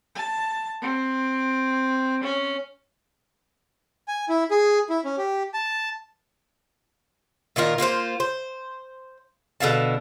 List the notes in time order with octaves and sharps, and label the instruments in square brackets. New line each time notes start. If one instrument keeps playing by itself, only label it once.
[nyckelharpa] A5
C4
C#4
[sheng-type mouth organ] G#5
E4
G#4
E4
C#4
G4
A5
[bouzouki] A#2 D#3 F4 A#4
A#3 F4 F#4 C5
C5
B2 D3 F5 A5